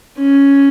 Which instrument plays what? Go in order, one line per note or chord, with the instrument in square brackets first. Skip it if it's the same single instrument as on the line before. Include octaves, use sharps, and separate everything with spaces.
[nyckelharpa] C#4